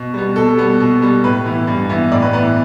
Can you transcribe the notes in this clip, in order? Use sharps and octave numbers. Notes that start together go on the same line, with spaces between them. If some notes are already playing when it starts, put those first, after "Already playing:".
Already playing: B2
G3 B3
B2 A4
G3 B3
B2
G3 B3
A2 B4
E3 B3
G2
E3 B3
A2 D5
B4
E3 B3 B4